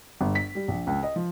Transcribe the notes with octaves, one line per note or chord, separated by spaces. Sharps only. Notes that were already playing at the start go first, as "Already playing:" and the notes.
G1
B6
G3
A#1
C#2
D#5
F3